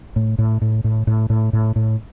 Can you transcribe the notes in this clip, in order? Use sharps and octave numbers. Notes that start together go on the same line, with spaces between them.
A2
A2
A2
A2
A2
A2
A2
A2